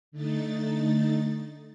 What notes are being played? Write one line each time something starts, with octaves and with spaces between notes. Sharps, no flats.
D3 A3 D#4 A6